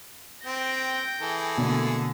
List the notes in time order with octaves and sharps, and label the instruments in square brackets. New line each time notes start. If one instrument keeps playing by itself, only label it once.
[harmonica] C4 [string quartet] G5 G6 A#6
[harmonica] E3 G#4 A4
[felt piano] B2 A3 A#3 [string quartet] D3